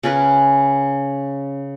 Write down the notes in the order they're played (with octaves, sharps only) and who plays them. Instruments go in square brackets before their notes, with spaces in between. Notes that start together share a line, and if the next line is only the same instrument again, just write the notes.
[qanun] C#3 C#4 A#4 B4